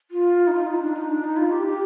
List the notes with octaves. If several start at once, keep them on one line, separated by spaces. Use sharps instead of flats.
F4
D#4
F4
D#4
D4
D#4
D4
D#4
F4
G4
G4